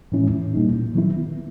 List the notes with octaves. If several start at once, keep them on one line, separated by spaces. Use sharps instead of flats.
A2 E3 G#3 C#4 E4
A#2 G3 A#3 D#4
D#3 F#3 B3 E4